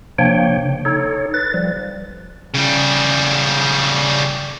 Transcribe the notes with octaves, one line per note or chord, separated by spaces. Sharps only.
C3 F3 A#3 D4 C#5 G5
C#3
D#4 A4 C#5
B4 A6
F3 G3
C#3 G3